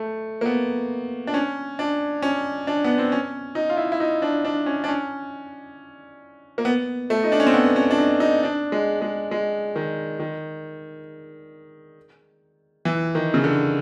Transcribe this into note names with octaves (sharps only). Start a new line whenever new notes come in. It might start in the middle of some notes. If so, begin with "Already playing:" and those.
Already playing: A3
A#3
B3
D4
C#4
D4
C#4
D4
B3
C4
C#4
D#4
F4
E4
E4
D#4
D4
D4
C#4
D4
C#4
A#3
B3
A3
D#4
D4
C#4
C4
B3
C#4
D4
D#4
D#4
D4
G#3
G#3
G#3
D#3
D#3
E3
D#3
C#3
D3